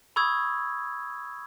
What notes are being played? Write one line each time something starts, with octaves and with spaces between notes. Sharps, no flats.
B5 C#6 D#6 E6 G#6